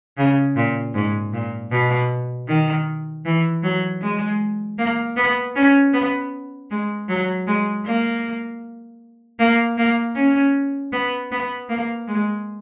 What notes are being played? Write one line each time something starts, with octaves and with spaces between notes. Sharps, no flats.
C#3
A#2
G#2
A#2
B2
D#3
E3
F#3
G#3
A#3
B3
C#4
B3
G#3
F#3
G#3
A#3
A#3
A#3
C#4
B3
B3
A#3
G#3